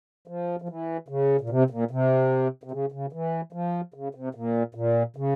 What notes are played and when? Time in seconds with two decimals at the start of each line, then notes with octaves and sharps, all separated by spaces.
0.27 F3
0.62 F3
0.69 E3
1.08 C#3
1.41 A#2
1.49 C3
1.70 A#2
1.91 C3
2.63 C3
2.71 C#3
2.92 C#3
3.13 E3
3.53 F3
3.94 C#3
4.15 C3
4.35 A#2
4.75 A#2
5.16 C#3